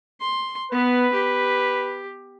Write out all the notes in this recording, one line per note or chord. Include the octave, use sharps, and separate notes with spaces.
C6
B3 B4
G4